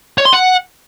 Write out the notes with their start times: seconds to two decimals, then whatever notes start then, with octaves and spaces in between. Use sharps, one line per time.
0.18 C#5
0.25 C6
0.33 F#5